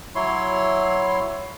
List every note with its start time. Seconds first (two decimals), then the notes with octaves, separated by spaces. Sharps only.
0.15 F#3 E4 C#5 C6